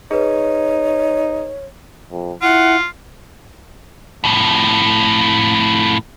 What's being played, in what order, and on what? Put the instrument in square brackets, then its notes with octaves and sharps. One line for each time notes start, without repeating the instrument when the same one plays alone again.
[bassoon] D#4 [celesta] G#4 B4 [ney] C#5
[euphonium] F2
[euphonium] E4 [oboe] F4 [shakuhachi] F#5
[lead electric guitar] F2 A2